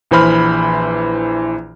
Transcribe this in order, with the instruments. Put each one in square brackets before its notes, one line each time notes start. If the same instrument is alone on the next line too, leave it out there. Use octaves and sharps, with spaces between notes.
[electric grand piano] A#1 E3 C5 B5 F6